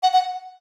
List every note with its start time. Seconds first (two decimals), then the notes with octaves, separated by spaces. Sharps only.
0.03 F#5
0.13 F#5